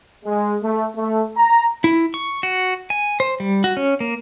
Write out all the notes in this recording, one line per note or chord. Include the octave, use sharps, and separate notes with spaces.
G#3
A3
A3
A#5
E4
C#6
F#4
G#5
C5
G3
F#4
C#4
A#3